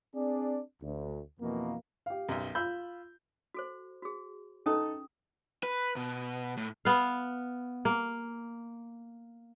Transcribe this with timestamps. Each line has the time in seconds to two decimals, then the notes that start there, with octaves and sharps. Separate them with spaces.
0.15 C4 D4 G#4 D5
0.81 D2
1.40 F2 B2 E3 A#3
2.06 G4 F5
2.29 B1 F#2
2.55 F4 B5 E6 G6
3.54 F#4 A4 C5
4.02 F#4 G#4
4.66 C#4 D#4 A4 D#6
5.63 B4
5.96 B2
6.57 A2
6.85 B3 F5
7.85 A#3